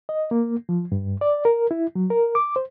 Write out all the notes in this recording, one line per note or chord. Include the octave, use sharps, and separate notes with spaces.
D#5
A#3
F3
G2
D5
A#4
E4
F#3
A#4
D6
C5